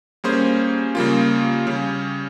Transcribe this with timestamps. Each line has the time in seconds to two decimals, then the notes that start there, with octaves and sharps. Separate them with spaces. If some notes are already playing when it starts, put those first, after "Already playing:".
0.24 G3 A#3 C#4 G#4 C5
0.95 C#3 G3 A#3 F4
1.67 C#3 G3 C#4